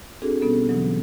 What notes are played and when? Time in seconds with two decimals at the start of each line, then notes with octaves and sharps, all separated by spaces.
0.22 C4 D4 F#4 G#4 A4
0.42 B2 G3 B3 C#4 G4 A4
0.69 B2 D3 E3 F#3